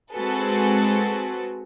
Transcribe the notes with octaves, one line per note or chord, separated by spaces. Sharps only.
G#3 C4 F#4 G#4 A4 B4